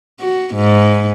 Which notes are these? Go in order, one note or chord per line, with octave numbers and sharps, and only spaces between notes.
F#4
G#2